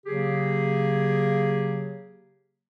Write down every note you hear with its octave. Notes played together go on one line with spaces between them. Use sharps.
C#3 F#3 A#3 G4 G#4